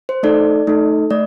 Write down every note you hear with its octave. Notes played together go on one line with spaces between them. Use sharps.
C5
A3 D#4 A4 D5
A3 D#4 A4
A3 D5